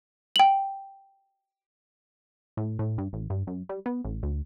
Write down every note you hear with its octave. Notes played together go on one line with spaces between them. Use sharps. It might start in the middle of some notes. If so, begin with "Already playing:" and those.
G5 F#7
A2
A2
G2
A1
G2
F#2
G3
B3
A1
D2